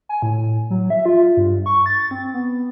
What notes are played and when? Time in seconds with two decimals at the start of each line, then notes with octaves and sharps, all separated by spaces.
0.09 G#5
0.22 A2
0.70 F#3
0.90 E5
1.06 F4
1.37 G2
1.66 C#6
1.86 A6
2.11 C4
2.34 B3